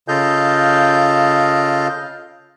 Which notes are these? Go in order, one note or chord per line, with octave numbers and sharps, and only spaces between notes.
C#3 F4 A4 D#5 F5 G6